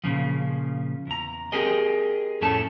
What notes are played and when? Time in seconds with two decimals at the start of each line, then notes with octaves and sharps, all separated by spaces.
0.04 A#2 C#3 F3
1.07 E2 A#5
1.52 C4 G4 G#4 A#4 D#5
2.41 F2 A2 A3 C#4 A4 A5